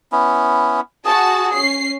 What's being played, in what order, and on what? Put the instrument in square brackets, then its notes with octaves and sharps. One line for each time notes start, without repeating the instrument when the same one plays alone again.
[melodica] B3 C#4 E4
[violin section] F#4 A5 [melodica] G#4
[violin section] C#4 C7